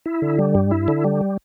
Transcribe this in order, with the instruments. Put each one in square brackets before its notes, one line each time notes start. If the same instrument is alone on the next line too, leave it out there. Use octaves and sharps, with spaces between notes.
[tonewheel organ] E4
D3
G3
G2
E4
D3
G3